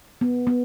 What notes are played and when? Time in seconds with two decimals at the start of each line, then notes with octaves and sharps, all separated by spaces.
0.21 B3
0.47 B3